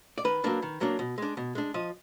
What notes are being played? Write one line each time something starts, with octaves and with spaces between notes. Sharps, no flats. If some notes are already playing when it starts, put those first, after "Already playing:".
D5
D#3 B4
F#3 A#3 D4
D#3
F#3 A#3 D4
B2
G#3 D4
B2
G#3 D4
F3 D#5